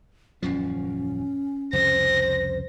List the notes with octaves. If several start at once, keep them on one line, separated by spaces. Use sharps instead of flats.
D#1 F#2 F3 C#4
C2 F2 C#3 C5 A#6